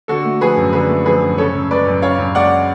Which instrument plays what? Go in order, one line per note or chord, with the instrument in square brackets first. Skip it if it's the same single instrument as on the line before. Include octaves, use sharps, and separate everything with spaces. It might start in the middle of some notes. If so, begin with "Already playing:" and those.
[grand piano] D3 F#4 A4
A3
F3 G#4 B4
F#2
D3 G#4 B4
A3
F3 G#4 B4
F#2
C#3 A4 C#5
F#2
G#3 B4 D5
F#2
C#3 C#5 F5
F#2
G#3 D5 F#5